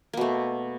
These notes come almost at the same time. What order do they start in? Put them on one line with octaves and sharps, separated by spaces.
A#3 B2 A3